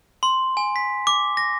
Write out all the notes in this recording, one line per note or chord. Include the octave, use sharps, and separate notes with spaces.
C6
G#5
B6
D6
A#6